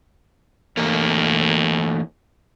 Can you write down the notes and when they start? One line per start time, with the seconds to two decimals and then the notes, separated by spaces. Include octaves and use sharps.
0.77 D#2 E3 A3 A#3